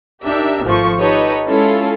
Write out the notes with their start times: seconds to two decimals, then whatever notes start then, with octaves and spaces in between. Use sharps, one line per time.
0.24 D4 D#4 G4 A#4 E5
0.65 G#1 F3 A3 C#6
1.00 D#4 G4 A4 B4 C#5 D#5
1.47 G#3 C#4 E4 F4 A4